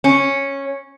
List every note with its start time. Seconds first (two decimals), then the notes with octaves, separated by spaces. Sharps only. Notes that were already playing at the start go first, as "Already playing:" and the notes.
0.04 C#4